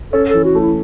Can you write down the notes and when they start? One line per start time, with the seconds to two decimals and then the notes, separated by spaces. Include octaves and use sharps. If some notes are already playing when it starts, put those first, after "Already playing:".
0.13 C#4 A4
0.29 A4
0.34 E3
0.45 F#4
0.55 A3
0.60 E4